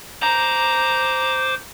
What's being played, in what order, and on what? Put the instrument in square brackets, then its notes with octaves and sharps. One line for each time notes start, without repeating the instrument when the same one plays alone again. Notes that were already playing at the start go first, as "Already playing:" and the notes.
[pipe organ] C5 D6 [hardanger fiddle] A#5